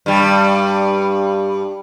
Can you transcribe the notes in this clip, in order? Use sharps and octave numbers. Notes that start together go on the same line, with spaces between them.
G2 G3